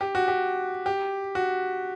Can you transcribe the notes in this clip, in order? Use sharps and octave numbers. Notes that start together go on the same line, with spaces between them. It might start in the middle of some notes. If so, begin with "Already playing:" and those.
G4
F#4
G4
G4
F#4